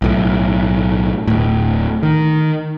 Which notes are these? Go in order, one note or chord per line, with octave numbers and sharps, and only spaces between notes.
B1 A2
D1 A2
D#3